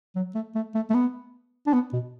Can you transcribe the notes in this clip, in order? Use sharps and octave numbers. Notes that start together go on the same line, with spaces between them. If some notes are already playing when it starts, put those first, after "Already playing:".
F#3
A3
A3
A3
A3
B3
D4
B3
B2